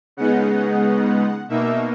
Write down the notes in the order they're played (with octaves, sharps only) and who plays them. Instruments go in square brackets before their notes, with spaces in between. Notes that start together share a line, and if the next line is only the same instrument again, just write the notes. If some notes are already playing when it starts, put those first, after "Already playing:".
[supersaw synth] C#3 G#3 B3 D#4 F#5
B2 A#3 D#4 E5